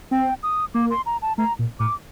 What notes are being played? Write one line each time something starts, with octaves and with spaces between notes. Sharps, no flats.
C4 G5
D#6
A#3 D6
C6
A#5
A5
A3 A#5
A#2
A2 D6